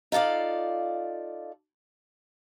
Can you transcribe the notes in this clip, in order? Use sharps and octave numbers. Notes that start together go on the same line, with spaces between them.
D#4 F4 A4 D5 F5